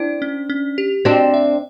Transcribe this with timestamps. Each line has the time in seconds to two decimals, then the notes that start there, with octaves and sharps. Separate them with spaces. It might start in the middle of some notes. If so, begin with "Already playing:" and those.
Already playing: C4 D4 E4
0.22 C#4
0.50 C#4
0.78 G4
1.05 C4 D4 F#4
1.34 E5